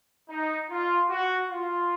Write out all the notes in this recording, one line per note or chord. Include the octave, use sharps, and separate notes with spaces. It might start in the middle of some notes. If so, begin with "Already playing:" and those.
D#4
F4
F#4
F4